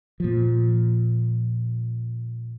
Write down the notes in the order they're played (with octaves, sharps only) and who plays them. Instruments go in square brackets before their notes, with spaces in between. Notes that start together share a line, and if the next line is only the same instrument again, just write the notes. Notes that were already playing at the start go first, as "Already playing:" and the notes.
[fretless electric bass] A#2 F3